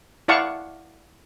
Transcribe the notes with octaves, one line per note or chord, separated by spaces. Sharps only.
E4 D5 F5 F#5 A5 C#6